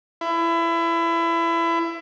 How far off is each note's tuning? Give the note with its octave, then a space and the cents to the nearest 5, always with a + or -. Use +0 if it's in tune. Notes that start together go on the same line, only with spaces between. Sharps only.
E4 +25